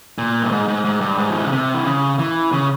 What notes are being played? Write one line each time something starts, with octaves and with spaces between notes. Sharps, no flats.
A#2
G2
G#2
G#2
G#2
G2
G#2
F3
E3
C#3
C3
E3
C#3
E3
C#3